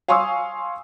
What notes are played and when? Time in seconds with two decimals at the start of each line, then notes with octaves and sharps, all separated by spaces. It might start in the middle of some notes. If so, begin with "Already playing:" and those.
0.08 F5 G#5 C6 C#6 D#6 E6